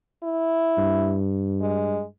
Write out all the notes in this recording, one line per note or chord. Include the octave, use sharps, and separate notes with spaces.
E4
G2
G#3